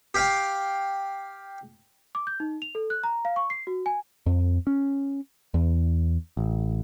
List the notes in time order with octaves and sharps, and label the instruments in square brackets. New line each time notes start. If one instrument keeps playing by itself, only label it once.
[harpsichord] G4 F5 G5
[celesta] D6
G6
D#4
F7
A4
F#6
A#5
F5
C#6
C7
F#4
G#5
[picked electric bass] F2
C#4
E2
A1